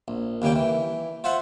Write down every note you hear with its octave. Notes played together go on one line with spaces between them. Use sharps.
A#1
D#2 C#3 G3 A#3 G5
E3
F4 C5 E5 F#5